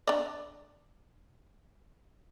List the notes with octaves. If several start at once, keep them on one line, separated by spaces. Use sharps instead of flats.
D4 D5